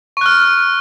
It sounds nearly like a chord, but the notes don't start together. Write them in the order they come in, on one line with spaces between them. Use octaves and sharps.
C#6 F#6 F6